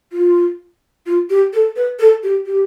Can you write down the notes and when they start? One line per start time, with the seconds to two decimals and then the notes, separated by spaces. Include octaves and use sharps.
0.13 F4
1.06 F4
1.30 G4
1.53 A4
1.76 B4
1.99 A4
2.23 G4
2.46 G4